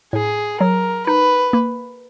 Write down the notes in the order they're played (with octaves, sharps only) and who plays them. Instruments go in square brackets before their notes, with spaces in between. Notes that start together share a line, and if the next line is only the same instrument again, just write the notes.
[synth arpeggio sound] A2 [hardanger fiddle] G#4
[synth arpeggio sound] F#3 [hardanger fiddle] A#4
[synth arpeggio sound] D#4 [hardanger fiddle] B4
[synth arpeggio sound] A#3